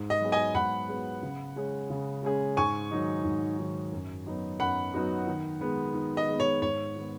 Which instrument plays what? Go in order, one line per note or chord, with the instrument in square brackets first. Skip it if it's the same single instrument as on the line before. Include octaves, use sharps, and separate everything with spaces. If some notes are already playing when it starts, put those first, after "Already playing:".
Already playing: [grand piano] G#2
[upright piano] D#5
[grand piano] F#3 B3 G#4
[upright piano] D#5 G#5
[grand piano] G#2 [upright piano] F#5 B5
[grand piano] F#3 B3 G#4
C#3
G#3 C#4 G#4
C#3
G#3 C#4 G#4
[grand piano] G#2 [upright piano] G#5 C#6
[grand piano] D#3 F#3 D#4
G#2
D#3 F#3 D#4
F#2
F#3 B3 D#4 F#4
[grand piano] F#2 [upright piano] F#5 B5
[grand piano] F#3 B3 D#4 F#4
D#3
G#3 B3
D#3
[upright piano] D#5
[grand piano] G#3 B3
[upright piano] C#5
[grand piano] G#2 [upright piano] C#5
[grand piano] D#3 B3